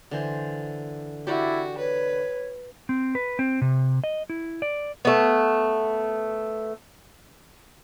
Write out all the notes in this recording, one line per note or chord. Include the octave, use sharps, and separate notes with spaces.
D3 E3 C5
E4 F#4 G4 D5 F#5
B4 C#5
C4
B4
C4
C3
D#5
E4
D5
A3 B3